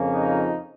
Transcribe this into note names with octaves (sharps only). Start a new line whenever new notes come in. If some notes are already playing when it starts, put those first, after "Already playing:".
Already playing: F2 C#3 F3 A#3 C#4
D#4